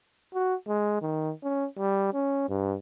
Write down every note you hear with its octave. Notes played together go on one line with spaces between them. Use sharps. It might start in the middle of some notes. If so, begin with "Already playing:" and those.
F#4
G#3
D#3
C#4
G3
C#4
G2